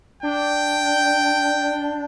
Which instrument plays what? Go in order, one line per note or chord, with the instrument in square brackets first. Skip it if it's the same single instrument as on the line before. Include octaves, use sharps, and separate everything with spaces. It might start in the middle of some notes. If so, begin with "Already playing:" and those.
[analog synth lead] D4 [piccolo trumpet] G5